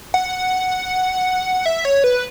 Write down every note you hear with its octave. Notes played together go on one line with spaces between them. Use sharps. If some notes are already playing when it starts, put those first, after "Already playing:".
F#5
E5
C#5
B4